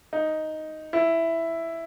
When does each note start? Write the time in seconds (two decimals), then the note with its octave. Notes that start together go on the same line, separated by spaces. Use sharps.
0.13 D#4
0.93 E4